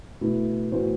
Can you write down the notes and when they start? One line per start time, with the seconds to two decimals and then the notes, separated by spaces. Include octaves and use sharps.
0.21 B2 A3 E4 B4
0.72 A2 E3 B3 F#4 C5